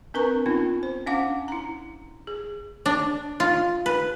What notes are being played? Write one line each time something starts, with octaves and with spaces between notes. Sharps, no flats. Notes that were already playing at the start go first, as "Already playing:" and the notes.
C4 D4 A#4 B4 A#5 C#6
B3 C#4 D#4 F4
C5
C#4 D4 F5 F#5 D6
E4 A#5
G#4
D4
F4
B4